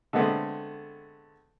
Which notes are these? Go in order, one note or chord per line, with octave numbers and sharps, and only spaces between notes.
D3 G#3 A3 B3 C4